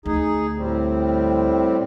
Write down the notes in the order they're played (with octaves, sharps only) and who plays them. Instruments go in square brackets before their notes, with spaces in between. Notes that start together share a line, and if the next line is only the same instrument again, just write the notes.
[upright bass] D2 [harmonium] D#4 G#4
[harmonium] A2 G3 C4